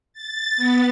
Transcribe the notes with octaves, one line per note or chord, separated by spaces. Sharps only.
A6
B3